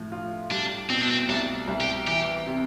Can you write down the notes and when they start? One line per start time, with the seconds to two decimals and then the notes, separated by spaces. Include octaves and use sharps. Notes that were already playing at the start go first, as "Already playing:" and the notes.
Already playing: A2 F3
0.12 F4
0.51 G3 D4
0.90 B2 C4
1.01 D4
1.11 C4
1.29 C2 D4
1.68 C2
1.81 G4
2.07 E3 G4
2.46 C3